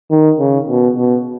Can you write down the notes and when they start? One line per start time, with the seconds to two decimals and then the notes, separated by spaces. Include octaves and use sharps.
0.10 D#3
0.39 C#3
0.68 B2
0.97 B2